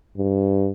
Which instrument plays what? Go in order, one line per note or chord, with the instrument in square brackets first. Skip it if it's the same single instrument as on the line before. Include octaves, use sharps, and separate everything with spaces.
[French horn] G2